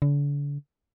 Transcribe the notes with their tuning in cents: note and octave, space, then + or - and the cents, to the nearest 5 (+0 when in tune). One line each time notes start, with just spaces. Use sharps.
D3 -40